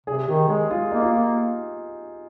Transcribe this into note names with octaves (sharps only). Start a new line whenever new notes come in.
C3 G#4
D#3 G4
G#3 G#4
F4
A#3 D#4
F4
A#3